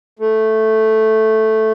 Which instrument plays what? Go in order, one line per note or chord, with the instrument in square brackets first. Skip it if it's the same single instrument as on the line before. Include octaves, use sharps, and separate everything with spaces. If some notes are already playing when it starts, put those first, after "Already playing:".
[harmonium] A3